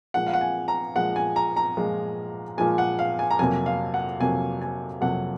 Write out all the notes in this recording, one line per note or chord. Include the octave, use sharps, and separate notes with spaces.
A#2 F3 G#3 F#5
F5
F#5
G#5
A#5
A#2 F3 G#3 F#5
G#5
A#5
A#5
A#2 F3 G#3
A#2 F3 G#3 G#5
F#5
F5
G#5
A#5
F2 C3 F#3 A#3 G#5
F5
F#5
F2 C3 F#3 A#3 G#5
G#5
F2 C3 F#3 A#3 F#5